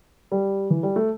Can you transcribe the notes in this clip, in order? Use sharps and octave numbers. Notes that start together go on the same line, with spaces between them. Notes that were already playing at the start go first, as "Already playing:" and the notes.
G3
E3
G3
A3